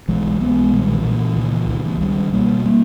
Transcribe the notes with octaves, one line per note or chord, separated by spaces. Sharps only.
B1 E3 G#3
B1 G#3 B3
A#2 D#3 G3
E3
A#2
E3
C#2 D#3
E3
C#2 D#3
E3
C#2 D#3 G3
B2 G3 A#3
G3 A#3